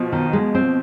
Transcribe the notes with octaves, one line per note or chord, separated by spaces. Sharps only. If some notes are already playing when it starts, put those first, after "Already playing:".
Already playing: B2 F3
D#3
G#3
C4